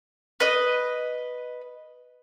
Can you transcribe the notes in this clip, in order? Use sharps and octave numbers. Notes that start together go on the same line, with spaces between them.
B4 D#5